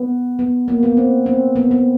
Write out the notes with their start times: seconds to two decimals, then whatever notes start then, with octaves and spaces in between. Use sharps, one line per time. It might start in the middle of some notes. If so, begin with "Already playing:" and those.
Already playing: B3
0.39 B3
0.68 A#3
0.83 B3
0.97 C4
1.26 C4
1.56 B3
1.71 B3